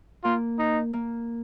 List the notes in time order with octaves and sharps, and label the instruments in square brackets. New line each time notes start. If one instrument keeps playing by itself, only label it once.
[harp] A#3 [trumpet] F4
[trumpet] D#4
[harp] A#3